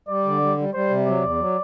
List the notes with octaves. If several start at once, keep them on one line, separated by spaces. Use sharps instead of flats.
G3 D5
D3
G3
G3
G3 C5
C3
F#3 D5
E2
F#3